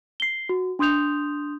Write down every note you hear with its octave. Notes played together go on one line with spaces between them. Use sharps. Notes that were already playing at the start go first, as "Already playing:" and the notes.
C7 G7
F#4
D4 C6 D#6 G6 F7